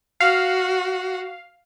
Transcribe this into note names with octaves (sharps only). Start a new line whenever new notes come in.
F#4 F5